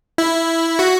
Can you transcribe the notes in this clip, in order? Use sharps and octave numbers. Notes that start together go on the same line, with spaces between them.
E4
F#4